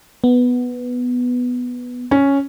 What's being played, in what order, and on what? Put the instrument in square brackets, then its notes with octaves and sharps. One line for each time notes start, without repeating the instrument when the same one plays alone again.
[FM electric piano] B3
[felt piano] C#4